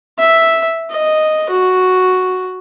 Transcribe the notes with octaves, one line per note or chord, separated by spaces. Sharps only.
E5
D#5
F#4